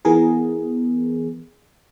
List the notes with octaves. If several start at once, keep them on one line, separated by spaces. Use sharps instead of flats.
E3 B3 G#4 A#4